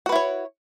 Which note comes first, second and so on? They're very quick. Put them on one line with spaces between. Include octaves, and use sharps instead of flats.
F#4 B4 E4 C#5